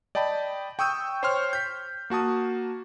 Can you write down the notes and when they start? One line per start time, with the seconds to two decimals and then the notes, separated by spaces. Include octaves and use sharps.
0.15 D5 D#5 G5 A5 B5
0.79 G5 C#6 D#6 E6 G6
1.23 C5 C#5 G5 C6 C#6 F6
1.53 G6 B6
2.10 A#3 F#4 A5 D#6